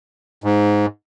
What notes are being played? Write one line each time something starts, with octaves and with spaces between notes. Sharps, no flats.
G#2